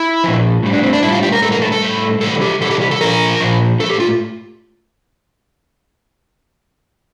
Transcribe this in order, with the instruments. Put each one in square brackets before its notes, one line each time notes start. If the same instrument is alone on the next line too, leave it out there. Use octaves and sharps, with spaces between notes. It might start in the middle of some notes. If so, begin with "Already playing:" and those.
Already playing: [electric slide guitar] E4
A#2 F3
A2 G3
D4
C4
D4
A2 E4
G3
F4
G4
A#4
A2 G3 A4
A#4
A4
A4
A2 G3
C3 E3 G3 A4
G4
C3 E3 G3 A4
G4
G4
A4
A#2 F3 A#4
A#2 F3
G3 A4
A2
G4
F4